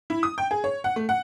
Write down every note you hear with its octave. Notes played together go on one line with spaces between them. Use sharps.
E4
D#6
G5
G#4
C#5
F#5
A3
F#5